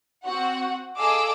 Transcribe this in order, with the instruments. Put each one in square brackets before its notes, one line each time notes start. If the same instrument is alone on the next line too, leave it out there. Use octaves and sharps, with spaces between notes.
[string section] C4 F#4 F#5
G#4 A4 D#5 F5 D6 E6